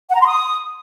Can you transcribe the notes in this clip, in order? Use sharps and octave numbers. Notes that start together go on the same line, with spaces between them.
F#5
A#5
C6
D#6